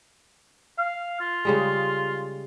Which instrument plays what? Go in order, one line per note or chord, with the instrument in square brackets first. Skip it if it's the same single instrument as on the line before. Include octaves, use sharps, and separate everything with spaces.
[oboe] F5
F4
[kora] C#3 G3 G#3